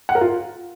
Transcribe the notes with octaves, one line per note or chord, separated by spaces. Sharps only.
F#5
A#4
F4